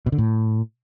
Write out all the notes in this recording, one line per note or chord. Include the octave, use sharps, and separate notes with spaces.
B2
D3
A2